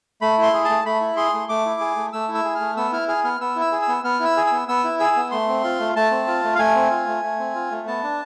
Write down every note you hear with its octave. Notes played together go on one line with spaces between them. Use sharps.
A3 B5
E4 C6
G#4
A5
A3
A3 B5
E4
G#4 C6
A3
A3 D6
E4
G#4
A3
A3 E6
E4
E6
G#4
F6
A3
B3 E6
E4 F6
G#4 F6
B3 F6
B3 E6
E4
E6
G#4
E6
B3
B3 F6
E4
E6
G#4
E6
B3
B3 E6
E4
G#4 E6
B3
A3 C6
C4
F4
A3
A3 A5
C4
F4
A3
F5
A3 G#5
C4
F4
A3
A3
C4
F4
A3
B3 A5
D4